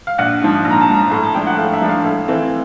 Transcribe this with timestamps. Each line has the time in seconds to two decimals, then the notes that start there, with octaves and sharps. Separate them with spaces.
0.07 F5
0.18 A#1 F#5
0.42 G#2 F3
0.65 A#1
0.71 A#5
0.81 A5
0.88 G#2 F3
0.96 A#5
1.11 A2 A#5
1.23 A5
1.34 F3 A3 D4 G5
1.47 F#5
1.58 A2 F5
1.73 E5
1.82 F3 A3 D4
1.89 F5
2.05 A2
2.28 E3 A3 C4